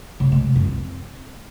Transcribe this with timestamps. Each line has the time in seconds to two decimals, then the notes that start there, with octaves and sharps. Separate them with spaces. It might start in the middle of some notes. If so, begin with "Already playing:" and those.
0.20 C#3
0.32 G#3
0.44 C3
0.56 F#2
0.67 C4